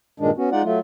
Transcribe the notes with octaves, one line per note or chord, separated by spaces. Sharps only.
G2 A#2 D#3 G#3 D4
B3 C#4 F#4
G#3 D#4 F4 D5 F#5
F#3 A3 F4